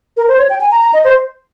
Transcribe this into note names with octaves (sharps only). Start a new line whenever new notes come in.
A#4
C5
C#5
G5
G#5
A#5
A#5
D#5
C5